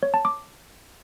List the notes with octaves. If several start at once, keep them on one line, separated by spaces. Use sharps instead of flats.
C#5
A5
D6